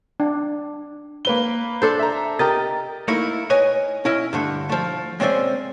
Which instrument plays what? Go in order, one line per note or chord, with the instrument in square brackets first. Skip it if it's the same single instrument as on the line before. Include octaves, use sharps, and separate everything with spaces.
[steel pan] D4
[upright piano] A#3 B4 G7
[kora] D4 A4 C5
[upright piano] E5 A#5
[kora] G4 A#4 D#5 [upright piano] A6
[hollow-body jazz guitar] A3 A#3 D#4 E4
B4 C#5 D#5 G#5
C#4 E4 D#5
G2 D3 A3
F3 A3
G#3 C4 C#4 C5 D5 E5